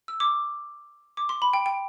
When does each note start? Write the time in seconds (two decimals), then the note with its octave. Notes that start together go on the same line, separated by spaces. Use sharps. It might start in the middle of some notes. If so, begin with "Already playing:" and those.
0.08 E6
0.20 D6
1.17 D6
1.29 C6
1.42 B5
1.53 G5
1.66 G5